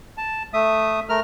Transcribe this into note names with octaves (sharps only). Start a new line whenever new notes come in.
A5
A3 E5 D#6
A3 A#4 F6